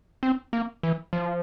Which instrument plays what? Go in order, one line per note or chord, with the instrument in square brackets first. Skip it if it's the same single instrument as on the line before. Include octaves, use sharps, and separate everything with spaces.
[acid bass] C4
A#3
E3
F3